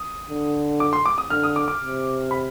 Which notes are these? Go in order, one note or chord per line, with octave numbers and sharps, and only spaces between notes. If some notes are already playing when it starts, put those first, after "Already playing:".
Already playing: D#6
D3
D6
C6
D6
D#6
D3 F6
D#6
D6
D6
C3
B5